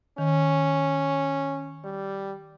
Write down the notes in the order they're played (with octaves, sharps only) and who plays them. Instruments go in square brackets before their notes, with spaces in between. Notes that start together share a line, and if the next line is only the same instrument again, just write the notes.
[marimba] D#3 [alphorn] C#4
[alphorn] G3